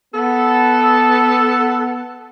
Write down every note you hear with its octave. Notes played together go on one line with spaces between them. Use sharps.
B3 A4